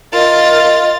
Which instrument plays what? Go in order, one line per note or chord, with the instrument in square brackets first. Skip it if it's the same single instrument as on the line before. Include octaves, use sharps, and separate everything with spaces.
[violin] F4 A6 [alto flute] A#4 [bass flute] D#5